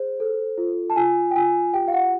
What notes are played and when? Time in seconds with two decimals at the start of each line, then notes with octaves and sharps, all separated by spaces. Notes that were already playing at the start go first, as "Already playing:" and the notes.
Already playing: G#4 C5
0.20 A4
0.58 F4
0.90 A5
0.96 F4 G#5
1.31 G5
1.36 F4 G#5
1.73 G4 G5
1.88 F5
1.93 F#5